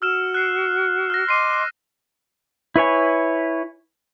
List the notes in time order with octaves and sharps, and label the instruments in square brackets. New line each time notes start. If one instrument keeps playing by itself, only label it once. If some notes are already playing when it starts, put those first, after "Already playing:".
[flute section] F#4 [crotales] E6 F6 E7
[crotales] F#6 C7
F6 F#6 A#6
[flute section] D#5 C6 D6 [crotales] C7 D#7
[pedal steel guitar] E4 B4 C#5 G#5